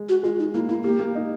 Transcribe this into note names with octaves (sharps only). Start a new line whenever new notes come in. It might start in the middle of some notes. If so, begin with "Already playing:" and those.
Already playing: G#3
F#4
G#3 F4
D#4
A#3 E4
A#3 E4
A#3 G4
A#3
D#4